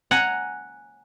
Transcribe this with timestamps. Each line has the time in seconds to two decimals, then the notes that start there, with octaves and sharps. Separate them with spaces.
0.11 F#5 G#5 A#5